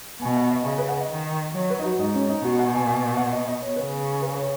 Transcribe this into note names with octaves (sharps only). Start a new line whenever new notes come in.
B2 G#5
F#5
D#5
C#3 D#5
B4
F#5
D#5
D#3
F#3 C#5
B4
D#4
F#4
G#2 D#4
C#4
D#4
B2 F#4
F#5
G#5
G#5
F#5
D#5
D#5
C#5
C#3 B4
B4
C#5